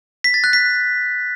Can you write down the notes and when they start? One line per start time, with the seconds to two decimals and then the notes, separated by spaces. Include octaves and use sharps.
0.24 B6
0.34 A6
0.44 F#6
0.53 B6